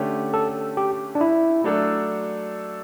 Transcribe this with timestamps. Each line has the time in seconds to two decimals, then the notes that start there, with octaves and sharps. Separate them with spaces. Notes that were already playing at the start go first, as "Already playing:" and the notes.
Already playing: D3 A3 C#4 G4
0.34 A4
0.77 G4
1.15 D4
1.21 E4
1.64 F#3 A3 D4 A4